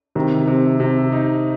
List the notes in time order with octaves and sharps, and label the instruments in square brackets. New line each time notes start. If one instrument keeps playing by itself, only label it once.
[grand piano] C3 [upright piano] D#3
[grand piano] C3
C3
D#4